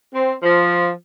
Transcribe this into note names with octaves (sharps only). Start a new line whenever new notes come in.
C4
F3